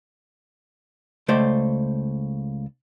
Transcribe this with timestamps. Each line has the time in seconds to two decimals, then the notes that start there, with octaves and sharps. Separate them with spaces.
1.28 C#2 A3 C5 D5